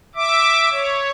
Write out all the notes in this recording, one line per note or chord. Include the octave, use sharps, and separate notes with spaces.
E5 D6
C#5